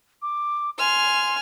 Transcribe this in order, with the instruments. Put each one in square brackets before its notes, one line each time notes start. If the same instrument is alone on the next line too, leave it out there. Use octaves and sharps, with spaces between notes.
[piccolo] D6
[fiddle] G#5 F6 [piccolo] C6